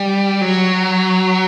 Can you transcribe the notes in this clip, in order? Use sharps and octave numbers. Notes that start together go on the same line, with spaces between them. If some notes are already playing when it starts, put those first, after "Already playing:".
Already playing: G3
F#3